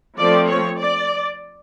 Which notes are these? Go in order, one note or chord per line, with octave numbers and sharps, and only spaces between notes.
F3 A3 C4 D5
C#5
D5